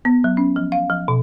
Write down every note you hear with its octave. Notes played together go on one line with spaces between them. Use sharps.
B3
F#3
C#4
F3
F5
F3
B2